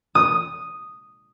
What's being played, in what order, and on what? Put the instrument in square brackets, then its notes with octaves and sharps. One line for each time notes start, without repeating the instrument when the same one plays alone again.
[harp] D#6